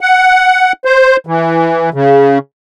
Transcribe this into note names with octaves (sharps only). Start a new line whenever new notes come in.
F#5
C5
E3
C#3